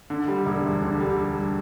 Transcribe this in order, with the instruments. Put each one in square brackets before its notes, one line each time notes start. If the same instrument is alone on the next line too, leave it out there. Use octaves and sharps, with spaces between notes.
[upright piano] D3
G3
E1
D2
D3
G3